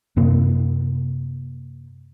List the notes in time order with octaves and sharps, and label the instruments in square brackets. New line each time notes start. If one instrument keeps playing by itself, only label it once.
[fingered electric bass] F#2 C3 A#3